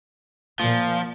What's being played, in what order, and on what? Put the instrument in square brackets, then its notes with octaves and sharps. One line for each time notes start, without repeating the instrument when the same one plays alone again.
[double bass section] A#2 [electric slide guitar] F3